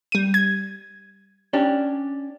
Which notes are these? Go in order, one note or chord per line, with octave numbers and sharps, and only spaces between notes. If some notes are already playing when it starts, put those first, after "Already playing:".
G3 D#7
G#6
C#4 D4 G4